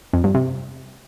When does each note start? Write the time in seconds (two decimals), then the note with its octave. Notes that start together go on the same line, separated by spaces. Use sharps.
0.13 F2
0.24 G2
0.35 C3